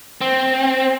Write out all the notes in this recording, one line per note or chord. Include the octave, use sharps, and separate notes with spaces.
C4